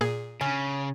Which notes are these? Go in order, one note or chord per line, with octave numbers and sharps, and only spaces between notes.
A#2 G#4
C#3 C#4